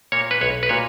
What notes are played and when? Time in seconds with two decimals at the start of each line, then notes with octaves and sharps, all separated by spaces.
0.12 A#2 A#3 C#5
0.31 B4
0.41 B1 C#5
0.63 B4
0.69 A#2 A#3 C#5